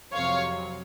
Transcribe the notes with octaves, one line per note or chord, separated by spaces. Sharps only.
F2 C3 F#3 C#5 F5